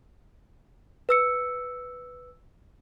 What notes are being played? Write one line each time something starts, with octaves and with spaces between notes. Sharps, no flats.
B4 E6 C#7